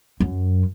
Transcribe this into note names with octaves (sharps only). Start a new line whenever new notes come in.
F#2